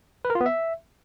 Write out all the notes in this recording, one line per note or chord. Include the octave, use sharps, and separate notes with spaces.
B4
A#4
F4
B3
E5